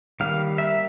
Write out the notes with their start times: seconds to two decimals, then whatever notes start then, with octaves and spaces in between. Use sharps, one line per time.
0.20 D#3 G3 A#3 F5
0.58 E5